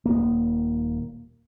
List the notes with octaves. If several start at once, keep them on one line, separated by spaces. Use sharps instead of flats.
D#1 D#2 A#3